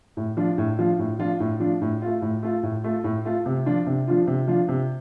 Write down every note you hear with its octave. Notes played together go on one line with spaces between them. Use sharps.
A2
F3 D4 F4
A2
F3 D4 F4
A2
F3 D4 F4
A2
F3 D4 F4
A2
A3 F4
A2
A3 F4
A2
A3 F4
A2
A3 F4
C3
F3 D4 F4
C3
F3 D4 F4
C3
F3 D4 F4
C3